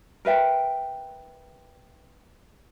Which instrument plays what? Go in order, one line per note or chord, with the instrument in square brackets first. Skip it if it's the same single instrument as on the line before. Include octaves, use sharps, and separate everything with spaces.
[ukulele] A#4 B4 E5 G5